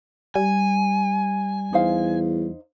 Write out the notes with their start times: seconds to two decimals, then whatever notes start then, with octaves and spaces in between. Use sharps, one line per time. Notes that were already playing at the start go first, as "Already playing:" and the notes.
0.35 G3 G#5
1.73 E2 D#4 C5 F5